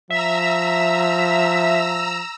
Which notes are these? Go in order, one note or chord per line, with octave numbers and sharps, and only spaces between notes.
F3 E5 A#5 E6